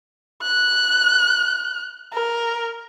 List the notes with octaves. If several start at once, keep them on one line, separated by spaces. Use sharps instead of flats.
F#6
A#4